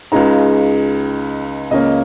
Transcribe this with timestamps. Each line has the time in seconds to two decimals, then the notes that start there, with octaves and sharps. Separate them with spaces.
0.12 C#2 C#3 G#3 D#4 A#5
1.71 C#2 C#3 A#3 C#4 D#5